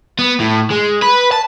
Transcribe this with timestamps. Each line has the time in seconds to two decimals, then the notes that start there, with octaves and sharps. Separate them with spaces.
0.19 B3
0.40 A2
0.71 G#3
1.02 B4
1.32 A5